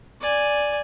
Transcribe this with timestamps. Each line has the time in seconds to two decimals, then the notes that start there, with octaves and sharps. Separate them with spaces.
0.21 D5 G#5